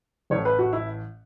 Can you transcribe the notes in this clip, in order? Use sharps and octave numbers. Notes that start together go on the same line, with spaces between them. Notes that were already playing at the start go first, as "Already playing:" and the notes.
A1 A2 E3 C#5
B4
F#4
E4